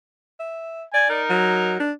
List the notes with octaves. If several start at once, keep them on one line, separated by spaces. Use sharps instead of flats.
E5
D5 G#5
D#4 A#4
F#3
D4